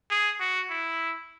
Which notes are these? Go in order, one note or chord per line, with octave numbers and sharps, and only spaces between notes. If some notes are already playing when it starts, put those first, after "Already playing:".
G#4
F#4
E4